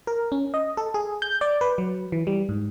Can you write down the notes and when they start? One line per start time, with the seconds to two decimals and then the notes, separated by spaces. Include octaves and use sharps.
0.07 A#4
0.32 C#4
0.54 D#5
0.77 A4
0.94 G#4
1.22 G6
1.41 D5
1.61 B4
1.78 F#3
2.12 E3
2.27 G3
2.49 G#2